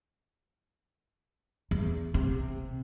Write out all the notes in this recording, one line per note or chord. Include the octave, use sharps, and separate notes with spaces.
E2
C3